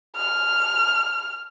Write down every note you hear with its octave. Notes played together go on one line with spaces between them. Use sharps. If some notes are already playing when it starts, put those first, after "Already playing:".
F6